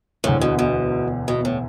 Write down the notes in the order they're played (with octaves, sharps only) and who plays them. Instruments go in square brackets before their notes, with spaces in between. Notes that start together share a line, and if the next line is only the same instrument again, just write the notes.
[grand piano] E1 D2 D3 [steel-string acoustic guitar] A2
[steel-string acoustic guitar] B2
B2
B2
A2